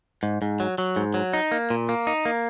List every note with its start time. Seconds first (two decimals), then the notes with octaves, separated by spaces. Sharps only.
0.23 G#2
0.42 G#2
0.60 F#3
0.78 F#3
0.96 G#2
1.14 F#3
1.33 D#4
1.52 A#3
1.70 A#2
1.89 A#3
2.07 D#4
2.25 A#3